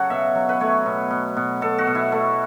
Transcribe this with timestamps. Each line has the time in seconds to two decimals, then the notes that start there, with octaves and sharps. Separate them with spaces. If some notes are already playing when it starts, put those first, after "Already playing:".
Already playing: C#3 F#3 F#4 A4 C#5 F#5
0.10 B2 E5
0.35 F#3
0.49 B4
0.60 A3 C#5
0.86 B2
1.11 B2
1.37 B2
1.61 B2 A4
1.78 F#4
1.87 B2
1.95 E4
2.12 A3